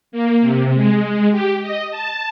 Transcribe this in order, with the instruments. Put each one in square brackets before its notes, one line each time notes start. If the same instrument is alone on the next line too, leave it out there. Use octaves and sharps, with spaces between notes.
[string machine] A#3
C3
G#3
G4
D#5
A5